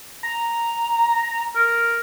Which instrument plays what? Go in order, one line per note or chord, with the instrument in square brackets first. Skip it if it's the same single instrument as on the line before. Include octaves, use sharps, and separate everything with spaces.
[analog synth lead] A#5
[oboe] A#4